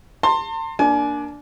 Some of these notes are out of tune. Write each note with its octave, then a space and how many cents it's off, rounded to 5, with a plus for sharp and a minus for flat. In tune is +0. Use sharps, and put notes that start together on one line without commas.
A5 +45 C6 +15
A#3 +0 D4 +0 G#5 +35